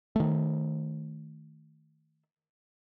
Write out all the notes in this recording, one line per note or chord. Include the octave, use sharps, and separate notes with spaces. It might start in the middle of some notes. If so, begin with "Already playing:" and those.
D#3 A3